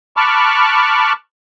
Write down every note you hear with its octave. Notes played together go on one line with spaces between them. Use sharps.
A5 B5 C#6 D6 F6 F#6